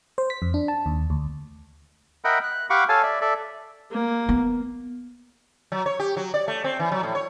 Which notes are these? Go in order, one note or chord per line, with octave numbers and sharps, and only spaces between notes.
C5
B6
F2
D4
A5
D#2
D2
A#4 D#5 E5 F#5 G5 B5
F#6
G4 F5 F#5 B5 C#6 D6
A4 C#5 F5 G#5 A5
D5 E5
A4 D5 E5
A#3
B3
F#3
C#5
G4
F#3
D5
A3
C4
E3
F#3
A2
C#5